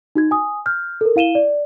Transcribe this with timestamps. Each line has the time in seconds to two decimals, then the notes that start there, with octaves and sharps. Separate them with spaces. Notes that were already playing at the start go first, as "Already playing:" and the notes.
0.15 D#4 F#4 G#6
0.31 G#5 D#6
0.66 F6 G6
1.01 A4 A#4
1.16 E4 F5 D#7 E7 G7
1.35 D5